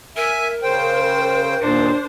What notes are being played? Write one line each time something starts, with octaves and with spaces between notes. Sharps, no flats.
A#4 E5 G#5
C#3 C5 G5
D#2 A#2 D4 C5